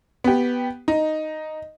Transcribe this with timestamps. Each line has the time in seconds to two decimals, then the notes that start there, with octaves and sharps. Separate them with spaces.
0.24 B3 G4
0.88 D#4